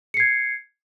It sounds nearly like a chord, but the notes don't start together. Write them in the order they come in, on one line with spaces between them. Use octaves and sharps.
C#7 C7 G#6